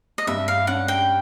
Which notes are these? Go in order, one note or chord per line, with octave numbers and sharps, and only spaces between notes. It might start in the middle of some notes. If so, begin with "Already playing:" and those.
D#5
G2 E5
F5
C#4 F#5
G5